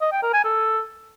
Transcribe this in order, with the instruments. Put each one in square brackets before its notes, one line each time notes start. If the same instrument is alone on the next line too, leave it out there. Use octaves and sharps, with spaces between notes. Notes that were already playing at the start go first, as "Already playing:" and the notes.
[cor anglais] D#5
G5
A#4
G#5
A4